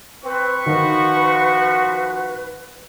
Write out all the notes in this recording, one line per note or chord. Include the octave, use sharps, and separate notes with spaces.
C4 B4 C#6
D#3 F3 F#4